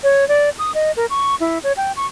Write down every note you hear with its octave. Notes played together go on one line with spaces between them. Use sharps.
C#5
D5
D#6
D#5
A#4
C#6
E4
C#5
G5
C#6